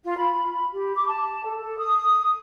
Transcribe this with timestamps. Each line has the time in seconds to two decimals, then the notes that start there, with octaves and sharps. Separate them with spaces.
0.04 F4
0.17 B5
0.72 G4
0.95 D6
1.08 A5
1.44 A4
1.59 A4
1.78 D#6